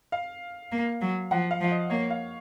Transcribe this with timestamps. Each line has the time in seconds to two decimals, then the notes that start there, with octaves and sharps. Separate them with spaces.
0.12 F5
0.72 A#3
1.01 F#3
1.31 F3 F#5
1.51 F5
1.61 F3 F5
1.71 D#5
1.90 A#3 C#5
2.10 F5